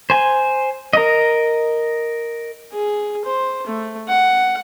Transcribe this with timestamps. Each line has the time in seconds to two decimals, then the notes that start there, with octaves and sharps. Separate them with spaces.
0.10 C5 G#5
0.93 A#4 D#5
2.73 G#4
3.25 C5
3.67 A3
4.08 F#5